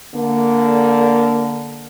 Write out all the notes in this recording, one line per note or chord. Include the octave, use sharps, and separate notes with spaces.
D3 A#3